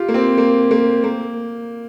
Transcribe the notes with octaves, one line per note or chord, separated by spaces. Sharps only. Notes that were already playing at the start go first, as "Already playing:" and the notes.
Already playing: F4 G4
A#3
C4
A#3
A#3
A#3